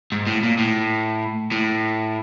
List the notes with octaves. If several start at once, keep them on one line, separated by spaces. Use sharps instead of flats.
G#2
A2
A#2
A2
A2